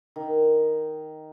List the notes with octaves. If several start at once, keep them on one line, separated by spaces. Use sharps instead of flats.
D#3